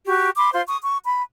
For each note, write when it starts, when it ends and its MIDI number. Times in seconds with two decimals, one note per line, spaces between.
0.07 0.30 66
0.07 0.30 67
0.07 0.30 85
0.37 0.51 83
0.37 0.51 84
0.37 0.51 86
0.53 0.62 65
0.53 0.62 72
0.53 0.62 84
0.67 0.78 85
0.67 0.78 87
0.82 0.98 85
1.05 1.22 83